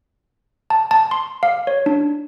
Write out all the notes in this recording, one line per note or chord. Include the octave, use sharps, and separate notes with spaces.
A5
A5
C6
F5
C#5
D4